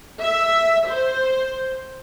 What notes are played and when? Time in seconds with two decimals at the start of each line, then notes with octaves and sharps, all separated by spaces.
0.21 E5
0.87 C5